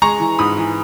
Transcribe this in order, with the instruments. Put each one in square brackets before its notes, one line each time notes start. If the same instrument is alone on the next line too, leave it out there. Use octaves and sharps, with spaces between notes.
[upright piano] G#3 A#5 C#6
E3
G#2 B5 D#6
E3